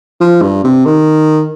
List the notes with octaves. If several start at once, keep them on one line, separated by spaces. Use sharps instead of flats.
F3
G2
C3
D#3